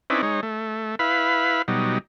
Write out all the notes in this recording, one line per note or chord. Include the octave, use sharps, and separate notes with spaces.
C4 C#4 D#4 E4 B4 D5
G#3 D#4 C#5
A3
E4 B4 F5 B5
B2 F#3 G3 D#4